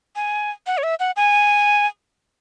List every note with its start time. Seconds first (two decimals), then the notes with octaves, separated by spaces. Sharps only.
0.16 G#5
0.67 F#5
0.78 C#5
0.83 E5
1.00 F#5
1.16 G#5